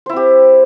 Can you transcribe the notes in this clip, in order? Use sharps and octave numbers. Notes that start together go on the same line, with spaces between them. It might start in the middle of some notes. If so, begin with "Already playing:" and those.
C4 E4 G4 C5